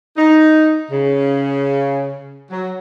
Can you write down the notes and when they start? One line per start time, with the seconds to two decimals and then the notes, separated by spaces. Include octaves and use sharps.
0.16 D#4
0.90 C#3
2.50 F#3